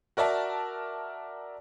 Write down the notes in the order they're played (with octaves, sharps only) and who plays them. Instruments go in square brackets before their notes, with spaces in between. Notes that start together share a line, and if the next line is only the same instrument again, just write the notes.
[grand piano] F#4 A#4 D5 E5 A5